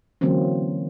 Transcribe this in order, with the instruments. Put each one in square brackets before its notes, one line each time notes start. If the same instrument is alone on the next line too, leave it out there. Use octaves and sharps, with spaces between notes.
[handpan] D3 E3 F#3 A#3 C4 C#4